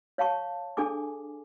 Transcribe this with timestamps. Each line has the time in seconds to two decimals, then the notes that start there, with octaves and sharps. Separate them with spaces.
0.18 C#5 F5 A5 C#6
0.77 D4 G#4 A4 G#5 D6